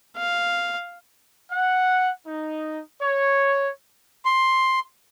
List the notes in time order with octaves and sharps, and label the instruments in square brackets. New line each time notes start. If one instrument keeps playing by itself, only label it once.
[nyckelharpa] F5
[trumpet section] F#5
D#4
C#5
[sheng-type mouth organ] C6